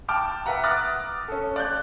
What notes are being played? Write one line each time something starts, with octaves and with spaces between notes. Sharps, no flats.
G5 A5 D6 F6 D7
B4 E5 F#5 A#5
D6 D#6 F6 F#6 A6 A#6
C#4 A4
D5 F#6 G6